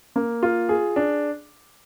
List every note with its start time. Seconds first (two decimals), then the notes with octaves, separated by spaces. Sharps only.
0.16 A#3
0.43 F4
0.69 G#4
0.96 D4